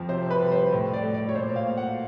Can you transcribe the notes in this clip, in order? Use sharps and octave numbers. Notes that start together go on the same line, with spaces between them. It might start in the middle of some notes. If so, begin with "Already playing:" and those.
Already playing: F2 F3
C3 C5
B4
G3
C5
A2
D5
A3
D5
C#5
A#2 C5
F5
A#3
F#5